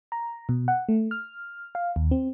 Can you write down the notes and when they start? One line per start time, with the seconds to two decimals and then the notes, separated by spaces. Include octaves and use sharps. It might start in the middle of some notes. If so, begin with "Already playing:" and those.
0.12 A#5
0.49 B2
0.68 F#5
0.89 A3
1.11 F6
1.75 F5
1.96 D#2
2.11 C4